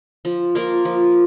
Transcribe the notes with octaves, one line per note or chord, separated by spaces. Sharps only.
F3
A#3 F4 A#4
F3